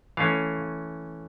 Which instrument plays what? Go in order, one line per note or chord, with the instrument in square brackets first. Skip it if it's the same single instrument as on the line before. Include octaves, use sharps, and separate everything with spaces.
[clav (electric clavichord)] E3 A3 C#4 F5